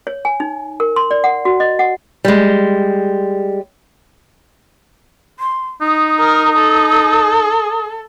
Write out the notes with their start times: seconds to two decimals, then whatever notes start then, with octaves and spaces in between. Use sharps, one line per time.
0.07 C#5
0.25 G#5
0.40 D#4
0.80 A#4
0.96 C6
1.11 D5
1.24 F#5
1.45 F#4
1.60 D#5
1.79 F#5
2.25 G3 G#3
5.39 C6
5.82 D#4 D#6
6.20 A#4
6.58 A4